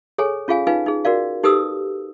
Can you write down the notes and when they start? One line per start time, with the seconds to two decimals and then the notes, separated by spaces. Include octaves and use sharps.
0.18 G#4 A4 C#5 G#5
0.48 C#4 F4 G#4 F5 G#5
0.67 D#4 F4 B4 F5 G#5
0.86 D#4 G#4
1.05 F#4 A#4 D5 F5
1.43 D#4 G4 A4 B4 D#6 E6